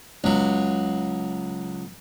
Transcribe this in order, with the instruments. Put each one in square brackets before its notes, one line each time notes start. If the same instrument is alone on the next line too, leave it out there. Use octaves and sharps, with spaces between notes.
[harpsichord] C#2 F#3